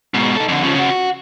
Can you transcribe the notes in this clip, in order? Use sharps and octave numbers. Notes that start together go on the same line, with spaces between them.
G#2 B2
D#4 A4
F2 D3
C#3 F3
C#3 F#4
F#4